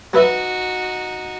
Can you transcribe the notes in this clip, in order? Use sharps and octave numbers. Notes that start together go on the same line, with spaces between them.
F#3 D#4 F#4 B4 E5